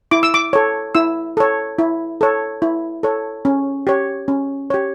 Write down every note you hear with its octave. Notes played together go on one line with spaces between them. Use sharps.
E4 D6
E6
D6
A4 C#5
E4 E6
A4 C#5
E4
A4 C#5
E4
A4 C#5
C#4
G4 C#5
C#4
G4 C#5